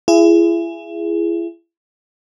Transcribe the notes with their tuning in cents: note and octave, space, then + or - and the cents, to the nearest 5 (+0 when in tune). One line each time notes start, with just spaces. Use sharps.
E4 +35 G#4 +0